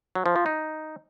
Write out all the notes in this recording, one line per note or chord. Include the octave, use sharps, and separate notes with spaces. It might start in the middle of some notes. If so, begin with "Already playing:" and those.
F#3
F3
F3
D#4